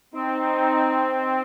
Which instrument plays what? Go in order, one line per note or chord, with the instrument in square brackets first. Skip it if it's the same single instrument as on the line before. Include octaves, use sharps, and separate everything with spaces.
[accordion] C4 [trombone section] D#4